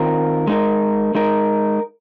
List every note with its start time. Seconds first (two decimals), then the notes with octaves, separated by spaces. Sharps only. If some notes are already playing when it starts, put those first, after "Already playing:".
Already playing: D#3 C4 F4 A#4
0.47 G#3 D#4 A#4
1.15 G#3 D#4 A#4